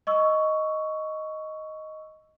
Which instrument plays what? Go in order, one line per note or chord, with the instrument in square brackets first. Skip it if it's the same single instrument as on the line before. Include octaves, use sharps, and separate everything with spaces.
[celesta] D#5 C#6 E6